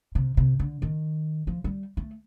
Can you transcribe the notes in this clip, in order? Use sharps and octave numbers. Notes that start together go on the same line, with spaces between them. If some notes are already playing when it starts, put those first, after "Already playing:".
C3
C3
D3
D#3
F3
G3
A3